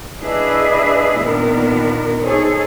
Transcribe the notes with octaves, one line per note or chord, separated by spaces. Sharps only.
D4 E4 G#4 B4 D#5 E5
A#2 D#3 B3 D4 A#4
D#4 G#4 A4 C5 C#5